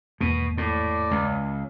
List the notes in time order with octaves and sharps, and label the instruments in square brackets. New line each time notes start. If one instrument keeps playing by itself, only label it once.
[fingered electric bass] G#1 E2 A#3 [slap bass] B2
[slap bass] A2 [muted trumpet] D5
[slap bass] C#2